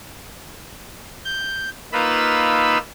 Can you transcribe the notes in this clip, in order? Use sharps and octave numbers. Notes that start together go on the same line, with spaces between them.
G6
A#3 D#4 F4 B4 B5 E6